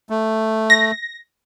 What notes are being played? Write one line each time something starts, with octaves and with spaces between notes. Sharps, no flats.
A3
A#6